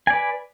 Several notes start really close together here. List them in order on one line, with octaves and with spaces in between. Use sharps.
G#5 D5 B4